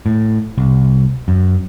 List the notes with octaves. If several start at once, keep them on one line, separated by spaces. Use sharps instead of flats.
A2
C2
F#2